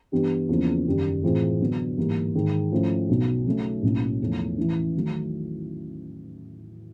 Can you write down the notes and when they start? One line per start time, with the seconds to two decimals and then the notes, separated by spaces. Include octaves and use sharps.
0.12 G2 E3 G3 B3
0.49 E2 C#3 F3 A#3 C#4
0.86 F#1 F#2 D#3 G3
1.23 A2 E3 G#3 C4 F4
1.60 D3 F#3 B3 D4
1.98 G#2 E3 G3 A#3
2.35 G#2 D#3 G#3
2.72 G#2 F3 A3 C#4 E4
3.09 B1 B2 F#3
3.46 C#3 F#3 A3 C#4
3.83 B1 A2 F#3 A#3 C#4
4.21 E2 C#3 F3 A3 C#4
4.58 A1 A2 E3
4.94 D#3 F#3 A3